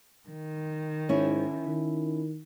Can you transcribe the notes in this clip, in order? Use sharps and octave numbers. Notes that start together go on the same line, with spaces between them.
D#3
G#2 C#4 E4
D#3